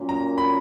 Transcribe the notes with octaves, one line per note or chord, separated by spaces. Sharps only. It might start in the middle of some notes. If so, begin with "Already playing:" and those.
Already playing: A#2 F#3 A#3 C#4
A#5
B5